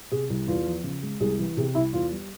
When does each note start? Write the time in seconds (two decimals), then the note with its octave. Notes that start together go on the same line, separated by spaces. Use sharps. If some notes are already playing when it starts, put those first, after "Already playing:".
0.12 C3 G#4
0.30 C2
0.48 E2 F4
0.66 F3
0.84 C#3
1.03 G#3
1.20 C2 G#4
1.39 E3
1.57 C3 G#4
1.75 C2 E4
1.93 E2 F4
2.11 G3